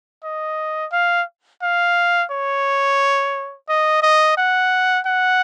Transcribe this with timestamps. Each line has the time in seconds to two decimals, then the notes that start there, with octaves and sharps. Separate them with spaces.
0.24 D#5
0.92 F5
1.62 F5
2.31 C#5
3.69 D#5
4.03 D#5
4.37 F#5
5.07 F#5